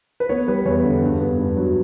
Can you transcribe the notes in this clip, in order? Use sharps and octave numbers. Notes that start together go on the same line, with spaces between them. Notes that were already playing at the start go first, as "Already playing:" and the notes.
B4
B3 C#5
G3 B4
E2 C#5
D3
G2
B3
G2
F#3